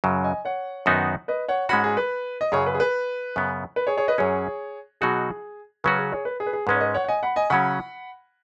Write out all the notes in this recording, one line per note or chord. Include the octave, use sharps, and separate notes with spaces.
F#2 C#3 F#3
D#5 G#5
C#5 F#5
F#2 D#3 B3 D#4 F#4
B4 D#5
C#5 F#5
G#2 G#3 C#4 F#4 F#5 B5
G#4
B4
D#5
F#2 C#3 F#3 G#4 C#5
B4
G#4
B4
F#2 C#3 B3
B4
G#4 C#5
G#4 C#5
B4 D#5
F#2 F#3 C#4 G#4 C#5
B2 F#3 D#4 F#4 G#4
C#3 F#3 C#4 F#4 B4
G#4
G#4 C#5
B4
G#4
B4
G#4
G#2 G#3 C#4 B4
C#5
B4 D#5
C#5 F#5
F#5
D#5 G#5
F#5 B5
D#5 G#5
C#3 F#3 C#4 F#5 B5